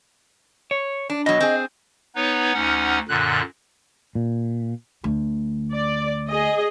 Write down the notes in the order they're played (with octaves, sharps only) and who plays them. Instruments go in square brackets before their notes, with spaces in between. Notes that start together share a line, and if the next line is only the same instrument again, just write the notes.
[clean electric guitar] C#5
[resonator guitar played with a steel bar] D4
[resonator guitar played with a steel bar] B2 F#3 [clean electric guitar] D#5
[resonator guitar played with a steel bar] C4 G#4
[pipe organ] B3 D#4 B4 C#5
D2 C#4 D#4 F#5
F#2 A#2 D3 F#6
[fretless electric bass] A#2
[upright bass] D2
[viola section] D5
G#4 D#5